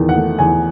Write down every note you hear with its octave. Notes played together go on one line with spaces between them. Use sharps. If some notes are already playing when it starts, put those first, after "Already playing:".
Already playing: E2 D#3
F#5
A3
E2 G#5